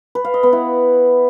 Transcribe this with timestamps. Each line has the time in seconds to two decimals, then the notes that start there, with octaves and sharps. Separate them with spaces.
0.15 B4
0.25 F5
0.34 D#5
0.43 B3
0.53 E4